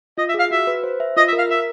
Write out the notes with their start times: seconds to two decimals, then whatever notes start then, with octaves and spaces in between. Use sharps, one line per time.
0.18 F4 D#5
0.29 E5
0.34 G#4 F5
0.50 F#4 E5
0.67 B4
0.84 C5
1.00 E5
1.17 F4 D#5
1.28 E5
1.33 A#4
1.38 F5
1.49 A#4 E5